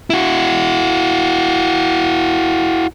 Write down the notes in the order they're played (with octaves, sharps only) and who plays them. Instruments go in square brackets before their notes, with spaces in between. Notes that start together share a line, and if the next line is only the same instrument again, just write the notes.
[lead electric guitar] E4 F#4